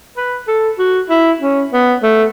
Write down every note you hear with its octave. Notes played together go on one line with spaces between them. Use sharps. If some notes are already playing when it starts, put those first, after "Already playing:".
B4
A4
F#4
E4
C#4
B3
A3